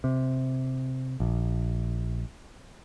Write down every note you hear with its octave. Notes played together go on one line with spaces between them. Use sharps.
C3
A#1